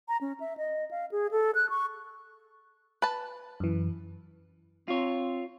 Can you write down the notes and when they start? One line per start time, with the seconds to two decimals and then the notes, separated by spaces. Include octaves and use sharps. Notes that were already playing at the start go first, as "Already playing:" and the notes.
0.08 A#5
0.21 C#4
0.40 E5
0.57 D#5
0.91 F5
1.12 G#4
1.31 A4
1.55 F#6
1.70 C#6
3.02 B4 A5
3.60 F#2 E3
4.88 C4 F4 C#5